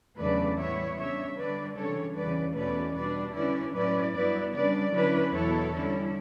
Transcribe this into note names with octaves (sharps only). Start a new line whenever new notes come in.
E2 C#3 F#3 A3 D4 B4 D5
A2 G3 B3 E4 C#5 E5
C#3 G3 D4 C#5 E5
D3 G3 D4 B4 D5
C#3 E3 G3 D4 A4 C#5
E2 C#3 E3 B4 D5
E2 B2 A3 C#4 B4 D5
B2 G3 D4 B4 D5
D3 G3 C#4 E4 B4 D5
A2 F#3 C#4 E4 B4 D5
G2 F#3 B3 E4 B4 D5
C#3 G3 D4 B4 D5
D3 F#3 C#4 E4 B4 D5
E2 B2 F#3 B3 E4 A4 C#5
D3 G3 C#4 E4